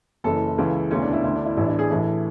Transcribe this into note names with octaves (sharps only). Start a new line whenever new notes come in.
F#1 F#2 E3 A4
C#2 C#3 E3
E1 D2 C#3 E3 C#4
D4
E4
D2 D3 E4
D4
E4
A1 A2 E3 E4
D4
E4
G#4
A1 A2 E3 A4